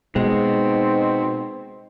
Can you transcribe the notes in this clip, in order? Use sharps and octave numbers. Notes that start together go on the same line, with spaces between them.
B2 G#3 C4 D#4